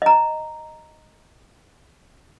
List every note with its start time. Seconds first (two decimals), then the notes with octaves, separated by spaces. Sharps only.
0.02 D#5 A#5